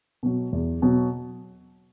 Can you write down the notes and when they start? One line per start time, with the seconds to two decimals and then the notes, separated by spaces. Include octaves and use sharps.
0.23 B2 F#3
0.52 E2
0.82 B2 F#3